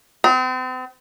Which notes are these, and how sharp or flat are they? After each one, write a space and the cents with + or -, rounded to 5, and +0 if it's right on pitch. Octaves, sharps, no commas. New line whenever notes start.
C4 -40